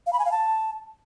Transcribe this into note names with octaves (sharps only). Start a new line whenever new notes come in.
F5
B5
G#5
F5
A5